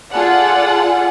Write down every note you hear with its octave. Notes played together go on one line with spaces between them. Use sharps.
F4 G#4 A4 D5 F#5